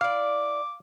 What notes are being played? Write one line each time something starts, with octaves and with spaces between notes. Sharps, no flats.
E4 D5 F5 D6